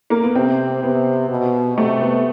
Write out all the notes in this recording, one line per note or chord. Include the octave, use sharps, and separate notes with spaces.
A#3
B3
C3 C4
C3 B3
B2
C3 A3
B3